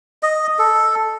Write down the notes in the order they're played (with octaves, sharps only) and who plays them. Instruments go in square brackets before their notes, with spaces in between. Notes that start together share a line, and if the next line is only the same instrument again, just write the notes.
[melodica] D#5
A4